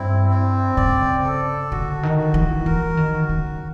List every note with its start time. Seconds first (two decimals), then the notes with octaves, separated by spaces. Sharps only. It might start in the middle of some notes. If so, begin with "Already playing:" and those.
Already playing: G2 C4 E4
0.30 C4
0.77 C#3 D5
1.24 A4
1.71 D3 F#4
2.03 D#3
2.18 F#4
2.34 E3
2.66 E3 A#4
2.97 D#3
3.13 F#4
3.29 C#3